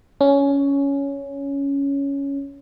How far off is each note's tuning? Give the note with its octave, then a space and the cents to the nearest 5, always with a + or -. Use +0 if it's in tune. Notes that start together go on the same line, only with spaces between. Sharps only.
C#4 +10